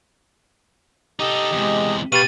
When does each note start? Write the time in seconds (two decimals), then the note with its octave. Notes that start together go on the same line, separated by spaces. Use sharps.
1.20 D#4 G4 A4 D#5
1.52 E2 C3 G#3
2.12 B2 G4 B4 F5 C#6 A6 D#7